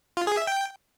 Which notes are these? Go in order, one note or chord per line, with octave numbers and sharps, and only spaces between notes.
F4
G#4
E5
G5